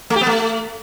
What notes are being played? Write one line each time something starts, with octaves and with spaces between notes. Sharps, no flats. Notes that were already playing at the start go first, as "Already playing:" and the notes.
A3
G4
B3
A3